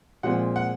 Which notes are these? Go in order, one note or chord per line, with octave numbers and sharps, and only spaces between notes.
A#2 F3 G#3 C4 F#5
F#5